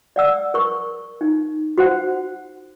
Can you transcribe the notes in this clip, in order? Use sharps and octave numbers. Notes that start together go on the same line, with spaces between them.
D5 F#5 E6
A#4 C#6
D#4
F#4 C5 F#5